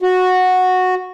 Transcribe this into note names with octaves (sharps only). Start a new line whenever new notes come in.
F#4